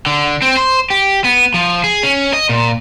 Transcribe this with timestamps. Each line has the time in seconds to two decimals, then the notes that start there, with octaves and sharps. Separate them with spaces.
0.06 D3
0.42 C4
0.57 C5
0.90 G4
1.24 B3
1.54 F3
1.84 G#4
2.03 C#4
2.33 D#5
2.49 A#2